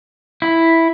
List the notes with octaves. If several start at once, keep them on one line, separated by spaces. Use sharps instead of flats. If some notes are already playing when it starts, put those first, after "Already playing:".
E4